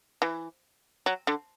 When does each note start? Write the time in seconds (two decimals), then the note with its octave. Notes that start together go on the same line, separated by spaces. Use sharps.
0.22 E3
1.06 F#3
1.27 D3